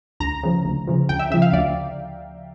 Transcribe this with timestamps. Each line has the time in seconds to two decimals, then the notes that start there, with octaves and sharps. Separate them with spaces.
0.20 D2 A#5
0.43 C#3 F3
0.65 D2
0.87 C#3 F3
1.09 D2 G5
1.19 E5
1.30 C#3 F3 E5
1.42 F5
1.53 D2 D5